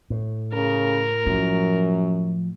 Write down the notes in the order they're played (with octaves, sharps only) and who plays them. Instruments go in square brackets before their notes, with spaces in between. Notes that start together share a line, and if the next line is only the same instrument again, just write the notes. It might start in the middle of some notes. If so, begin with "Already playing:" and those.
[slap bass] A2
[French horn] C#3 [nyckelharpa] A#4
[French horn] F#2 [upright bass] F3